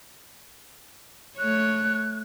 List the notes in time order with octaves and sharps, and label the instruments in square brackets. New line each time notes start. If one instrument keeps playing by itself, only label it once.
[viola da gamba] A3 C#5 [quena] F#6